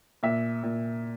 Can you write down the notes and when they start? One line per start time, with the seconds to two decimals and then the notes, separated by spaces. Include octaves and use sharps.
0.23 A#2 E5
0.63 A#2